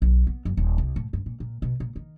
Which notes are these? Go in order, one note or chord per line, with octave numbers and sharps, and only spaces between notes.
B1
B3
F#1
D#1
C2
A2
G2
A#2
A#2
B2
A#2
D#3